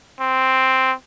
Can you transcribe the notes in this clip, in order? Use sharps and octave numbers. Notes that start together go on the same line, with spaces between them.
C4